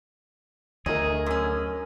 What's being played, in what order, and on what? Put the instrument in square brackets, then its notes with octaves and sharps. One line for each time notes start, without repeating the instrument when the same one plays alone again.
[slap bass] D2 [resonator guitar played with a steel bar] A3 [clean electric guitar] G#4 [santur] A#4 D#5
[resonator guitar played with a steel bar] F#2 C#4